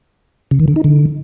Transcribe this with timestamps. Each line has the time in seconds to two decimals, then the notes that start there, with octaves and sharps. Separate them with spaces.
0.51 C#3
0.60 D#3
0.68 D3
0.76 D#4
0.84 D3